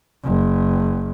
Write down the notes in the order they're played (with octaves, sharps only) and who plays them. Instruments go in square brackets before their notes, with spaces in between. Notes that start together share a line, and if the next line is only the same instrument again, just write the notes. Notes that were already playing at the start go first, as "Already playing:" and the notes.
[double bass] F#1